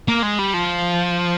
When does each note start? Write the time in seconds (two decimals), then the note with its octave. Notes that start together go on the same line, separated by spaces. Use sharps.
0.08 A#3
0.23 G#3
0.39 G3
0.54 F3